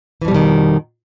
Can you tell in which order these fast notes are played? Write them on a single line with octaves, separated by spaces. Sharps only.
E3 F2 G3 B2 D#3